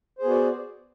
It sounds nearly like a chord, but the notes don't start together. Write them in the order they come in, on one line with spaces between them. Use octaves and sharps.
C5 G#4 B3 F#4 D5